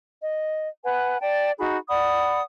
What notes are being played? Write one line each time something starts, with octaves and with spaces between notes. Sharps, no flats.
D#5
B4 F#5 G#5
D5 G5 A5
D#4 F#4 G#4 B5
D5 F#5 B5 D#6